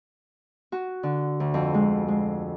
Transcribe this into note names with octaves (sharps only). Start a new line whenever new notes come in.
F#4
D3
D2
F2
G#3
G#3